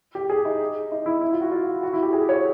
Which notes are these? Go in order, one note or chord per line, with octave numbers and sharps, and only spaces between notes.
G4
G#4
D#4
D#4
E4
E4
F4
F#4
F4
F#4
E4
G4
G#4
C#5